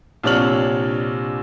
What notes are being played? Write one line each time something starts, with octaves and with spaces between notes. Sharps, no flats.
A#1 C3 D4 C#5 F6 F#7